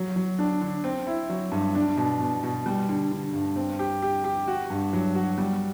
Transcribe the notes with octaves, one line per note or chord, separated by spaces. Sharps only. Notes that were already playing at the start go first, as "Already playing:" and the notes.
Already playing: F#3
F#3
D4
D3
C4
E4
F#3
G2
D4
B2
B2
B2
G3
D3
D3
G2
C4
G4
G4
G4
F#4
G2
F#3
F#4
G3